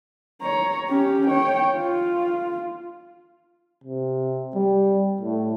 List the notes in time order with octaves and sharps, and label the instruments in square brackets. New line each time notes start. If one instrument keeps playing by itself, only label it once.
[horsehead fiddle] C#5 A#5
C#4 G4
C#5 G5
F4
[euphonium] C3
G3
A2